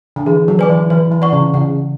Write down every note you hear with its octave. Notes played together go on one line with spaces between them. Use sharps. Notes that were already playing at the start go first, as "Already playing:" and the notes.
D3
E3 G#4
F#3
B4 D5 G#5 D6
E3
E3 B4
E3
D5 F#5 C#6
C#3
C#3 F#5